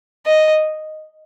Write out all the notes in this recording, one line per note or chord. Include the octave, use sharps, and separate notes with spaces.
D#5